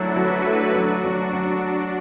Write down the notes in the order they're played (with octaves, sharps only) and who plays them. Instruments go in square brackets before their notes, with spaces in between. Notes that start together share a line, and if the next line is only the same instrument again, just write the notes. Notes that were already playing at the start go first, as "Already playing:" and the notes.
Already playing: [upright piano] F#3 A3 [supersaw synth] D4 E4 F#4 A4
[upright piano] F#3 [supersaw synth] F#4 B4
[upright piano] A3 [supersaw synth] F#4 B4
[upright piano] F#3 [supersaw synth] D4 F#4
[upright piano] F#3 [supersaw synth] D4
[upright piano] F#3 [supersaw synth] D4